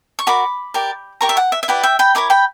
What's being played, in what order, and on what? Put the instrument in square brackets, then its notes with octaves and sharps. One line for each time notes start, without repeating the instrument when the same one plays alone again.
[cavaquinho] C#6
F#4 A#4 D5 B5 D6
G4 A#4 D5
G4 A#4 D5 A#5 C#6
E5
F#5
E5
E5
E4 G4 B4 D5 F#5
E5 G5
G5 B5
E4 A#4 C#5 B5 D6
G5 B5